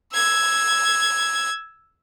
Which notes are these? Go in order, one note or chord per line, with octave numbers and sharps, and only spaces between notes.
E6 G#6